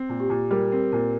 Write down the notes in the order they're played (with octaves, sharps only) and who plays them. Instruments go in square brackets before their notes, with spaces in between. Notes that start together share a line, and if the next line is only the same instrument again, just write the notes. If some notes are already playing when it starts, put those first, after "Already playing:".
Already playing: [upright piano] C4
A#2
[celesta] G4
[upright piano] A#2
[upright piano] G3 [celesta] A#4
[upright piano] C4 [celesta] A#4
[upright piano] A#2 [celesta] A#4